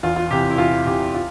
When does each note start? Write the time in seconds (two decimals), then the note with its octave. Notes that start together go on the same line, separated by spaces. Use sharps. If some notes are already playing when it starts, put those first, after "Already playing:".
0.03 E2 F4
0.16 F4
0.31 C3 E3 G4
0.50 E4
0.58 E2 F4
0.86 C3 E3 G4
1.14 F4